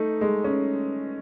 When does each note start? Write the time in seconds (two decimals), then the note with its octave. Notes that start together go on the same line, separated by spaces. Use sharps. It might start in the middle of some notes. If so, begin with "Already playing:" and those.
Already playing: A3 D#4
0.21 G#3
0.44 C#4